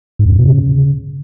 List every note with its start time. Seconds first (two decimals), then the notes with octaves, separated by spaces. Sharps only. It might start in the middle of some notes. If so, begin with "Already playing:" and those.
0.19 G#2
0.26 F2
0.32 F#2
0.39 B2
0.45 C#3